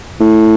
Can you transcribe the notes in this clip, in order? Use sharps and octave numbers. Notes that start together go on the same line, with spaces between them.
A2